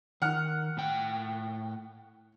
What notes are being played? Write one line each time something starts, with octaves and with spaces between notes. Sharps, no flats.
D#3 F#5 F6
A2 G5